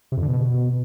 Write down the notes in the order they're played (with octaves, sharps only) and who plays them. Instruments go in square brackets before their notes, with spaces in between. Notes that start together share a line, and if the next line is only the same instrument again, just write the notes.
[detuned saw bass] C3
F2
D3
B2